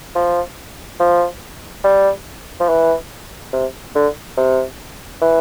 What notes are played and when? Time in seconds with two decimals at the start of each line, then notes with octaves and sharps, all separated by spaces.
0.15 F3
1.00 F3
1.84 G3
2.60 F3
2.69 E3
3.53 C3
3.95 D3
4.37 C3
5.22 E3